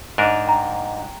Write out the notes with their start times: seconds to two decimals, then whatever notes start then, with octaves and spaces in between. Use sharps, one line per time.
0.18 G#2 D4 A#4
0.46 G5 A#5